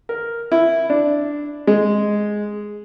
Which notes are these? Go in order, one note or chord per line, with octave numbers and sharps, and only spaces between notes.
A#4
E4
D4
G#3